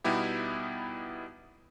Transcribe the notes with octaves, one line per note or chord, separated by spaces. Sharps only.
B2 G3 B3 D#4 E4 G4